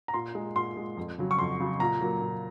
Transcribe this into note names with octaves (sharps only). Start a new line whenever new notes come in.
A#5
A#2 C6
G#3
A#2 C6
G#3
F2
C#3 F#3
C#6
F2 C6
C#3 F#3
A#2 A#5
F#3 A#3
A#2